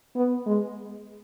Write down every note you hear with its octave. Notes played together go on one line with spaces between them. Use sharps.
B3
G#3